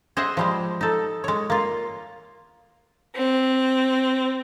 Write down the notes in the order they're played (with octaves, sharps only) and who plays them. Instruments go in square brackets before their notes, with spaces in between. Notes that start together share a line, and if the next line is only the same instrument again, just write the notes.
[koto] G#4 C5 D#5 E5 F#5
F3 G3 G#3
D#4 A4
G#3 C#5
A#3 F4
[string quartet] C4